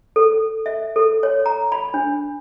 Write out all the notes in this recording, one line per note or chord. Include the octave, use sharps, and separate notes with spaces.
A4
E5
A4
C#5
A#5
B5
D4